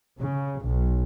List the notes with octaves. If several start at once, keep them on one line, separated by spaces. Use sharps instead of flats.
C#3
B1